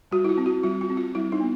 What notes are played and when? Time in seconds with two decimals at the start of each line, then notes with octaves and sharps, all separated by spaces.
0.11 G3 F#4
0.24 E4
0.29 F4
0.38 C4
0.46 F#4
0.63 G3 F4
0.81 F4
0.90 C4
0.97 F4
1.15 G3 E4
1.32 D#4
1.40 B3